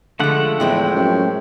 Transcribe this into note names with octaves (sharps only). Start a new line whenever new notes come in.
D3 F3 G#3 A3 F#5
E2 A2 G#3 C4 G5
F#2